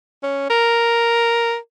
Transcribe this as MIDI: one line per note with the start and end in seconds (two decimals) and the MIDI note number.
0.23 0.49 61
0.50 1.56 70